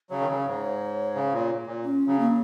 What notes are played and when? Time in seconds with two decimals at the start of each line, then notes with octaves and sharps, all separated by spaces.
0.10 C#3 F#3 C#5
0.21 D#3
0.28 C#3
0.46 G#2
1.15 C#3
1.32 A#2
1.67 A#2
1.85 C#4
2.07 C#3 F#3
2.20 A#3